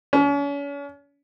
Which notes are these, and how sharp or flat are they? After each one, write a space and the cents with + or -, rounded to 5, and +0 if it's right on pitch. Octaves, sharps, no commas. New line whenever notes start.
C#4 +40